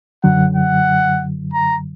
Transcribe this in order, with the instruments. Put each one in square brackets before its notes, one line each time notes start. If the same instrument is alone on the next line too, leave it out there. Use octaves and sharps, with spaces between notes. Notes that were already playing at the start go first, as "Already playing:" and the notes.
[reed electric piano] F#2 D3 F#3 [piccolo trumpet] F#5
[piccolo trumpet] F#5
A#5